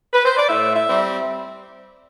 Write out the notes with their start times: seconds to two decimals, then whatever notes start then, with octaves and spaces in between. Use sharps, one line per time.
0.13 B4
0.24 C5
0.37 D5
0.49 A2 E5
0.74 E5
0.88 G3 C4